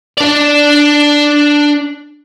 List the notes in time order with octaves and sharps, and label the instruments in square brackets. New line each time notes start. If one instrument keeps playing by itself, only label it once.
[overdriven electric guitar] D4 D5